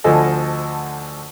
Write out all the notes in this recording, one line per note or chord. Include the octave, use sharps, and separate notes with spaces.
D2 D3 F3 A4 D#5 G#5